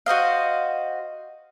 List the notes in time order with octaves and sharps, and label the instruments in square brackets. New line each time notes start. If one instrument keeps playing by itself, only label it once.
[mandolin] F#4 C5 D#5 F5